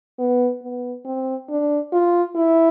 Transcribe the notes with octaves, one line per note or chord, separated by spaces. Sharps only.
B3
B3
C4
D4
F4
E4